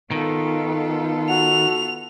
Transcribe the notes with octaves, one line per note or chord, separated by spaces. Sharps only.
D#3 B3 F4 A4
F#4 F7